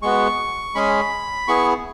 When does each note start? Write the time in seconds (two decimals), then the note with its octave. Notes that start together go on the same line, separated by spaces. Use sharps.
0.02 G#3 B3 F#4 C#6
0.75 G#3 C#4 G#4 B5
1.48 B3 E4 G#4 C#6